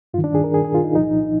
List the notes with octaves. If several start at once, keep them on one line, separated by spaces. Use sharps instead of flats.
G2 D#3 F4
D4
G#4
A#4
G#4
G#4
F4
D#4
C2 A#2 F3 D#4